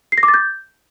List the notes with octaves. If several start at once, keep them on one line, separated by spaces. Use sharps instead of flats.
C7
A#6
D6
A6
G6